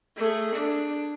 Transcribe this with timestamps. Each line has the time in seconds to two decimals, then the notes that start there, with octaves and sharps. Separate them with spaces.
0.17 A3 G#4
0.56 D4